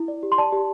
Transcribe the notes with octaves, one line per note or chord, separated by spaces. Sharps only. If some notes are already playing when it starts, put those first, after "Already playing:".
Already playing: E4
D5
G4
C6
D5 A5
G4